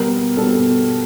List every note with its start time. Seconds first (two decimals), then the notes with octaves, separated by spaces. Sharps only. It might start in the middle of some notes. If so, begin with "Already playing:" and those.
Already playing: B2 G3 B3 A#4
0.37 B2 G3 B3 A4